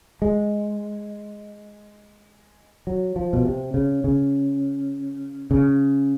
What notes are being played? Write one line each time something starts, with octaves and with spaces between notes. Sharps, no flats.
G#3
F#3
F3
B2
C3
C#3
C#3
C#3